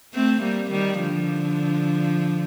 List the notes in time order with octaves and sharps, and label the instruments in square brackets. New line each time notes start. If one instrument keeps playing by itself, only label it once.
[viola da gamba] A3 C4
G3 A#3
D#3 G3
D3 F3